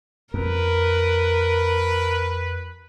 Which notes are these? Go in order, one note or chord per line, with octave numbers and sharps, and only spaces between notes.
F2 A#4 B4